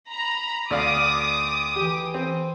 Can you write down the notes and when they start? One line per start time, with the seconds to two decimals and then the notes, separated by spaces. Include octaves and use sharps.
0.10 A#5 B5
0.71 D2 D5 F5 D6 D#6
1.76 E3 G4
2.14 C4